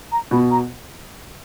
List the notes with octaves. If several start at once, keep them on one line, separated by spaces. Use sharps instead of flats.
A#5
B2 B5
A#5